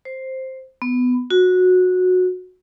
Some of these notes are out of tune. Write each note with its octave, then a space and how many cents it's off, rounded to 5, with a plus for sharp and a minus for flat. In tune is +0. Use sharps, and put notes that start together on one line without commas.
C5 +5
B3 +15
F#4 -15